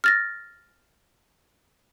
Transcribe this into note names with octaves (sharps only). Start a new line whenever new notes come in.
F6 A6 A#6